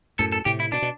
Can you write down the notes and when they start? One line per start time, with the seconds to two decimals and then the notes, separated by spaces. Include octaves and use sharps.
0.19 F#2 A2 A4
0.32 A4
0.45 A2 C3 G4
0.60 E4
0.72 B2 D4
0.82 B2